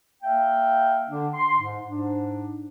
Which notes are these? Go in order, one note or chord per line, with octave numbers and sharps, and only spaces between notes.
A#3 E5 F5 G5
D3 D4
C6
G#2
G#2 D4